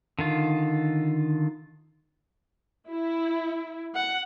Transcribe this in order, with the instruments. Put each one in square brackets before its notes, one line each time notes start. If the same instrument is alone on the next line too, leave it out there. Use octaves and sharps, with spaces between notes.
[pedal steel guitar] D3 D#3 F4
[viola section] E4
F#5